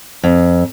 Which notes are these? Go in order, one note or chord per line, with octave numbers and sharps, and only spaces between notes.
F2